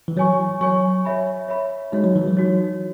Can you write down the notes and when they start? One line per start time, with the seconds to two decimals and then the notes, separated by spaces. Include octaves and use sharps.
0.08 E3
0.17 F#3 C#5 G#5 C#6
0.61 F#3 C#5 G#5 C#6
1.05 C#5 E5 B5
1.48 C#5 E5 B5
1.92 G#3 D#4 F#4 C#5
2.04 F#3
2.16 E3
2.28 F#3
2.37 D#4 F#4 C#5